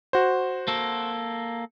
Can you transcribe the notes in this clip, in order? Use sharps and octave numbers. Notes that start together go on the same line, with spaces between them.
F#4 C5
A#3 A4